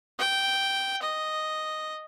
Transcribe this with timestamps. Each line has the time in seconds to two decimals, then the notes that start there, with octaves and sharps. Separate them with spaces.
0.19 G5
1.02 D#5